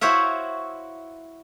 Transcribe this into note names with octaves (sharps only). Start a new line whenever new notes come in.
E4 F#4 C5 C#5 E5 F5